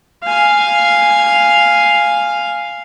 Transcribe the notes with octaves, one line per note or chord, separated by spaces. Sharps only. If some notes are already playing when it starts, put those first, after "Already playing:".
F5 G#5